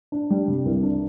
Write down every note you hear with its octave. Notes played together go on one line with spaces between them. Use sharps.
D4
G3
C3
C2
D4